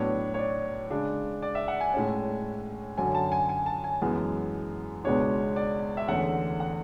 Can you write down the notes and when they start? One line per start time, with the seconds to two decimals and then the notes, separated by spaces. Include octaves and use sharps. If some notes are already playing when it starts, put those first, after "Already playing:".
Already playing: A2 F#3 B3 D4 C#5
0.34 C#5
0.39 D5
0.90 C#3 G#3 D4
1.42 D5
1.55 E5
1.68 F#5
1.80 G#5
1.94 A2 G#3 C#4
2.98 F#2 D3 F#3 C#4 G#5
3.15 A5
3.32 G#5
3.49 G#5
3.66 A5
3.84 G#5
4.02 F#2 E3 G#3 B3
5.04 C#2 B2 G#3 B3 D4 C#5
5.56 D5
5.97 E5
6.08 E2 D3 A3 C#4 F#5
6.60 F#5